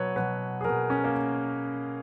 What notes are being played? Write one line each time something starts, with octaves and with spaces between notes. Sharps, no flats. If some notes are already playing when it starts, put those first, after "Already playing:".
Already playing: B2 F#3 B4 C#5
B2 F#3 B4
G#4
B2 F#3 A#4
C#4
A#3